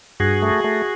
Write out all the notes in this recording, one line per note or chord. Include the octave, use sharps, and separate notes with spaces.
G2 F#4 G#4
A3
A3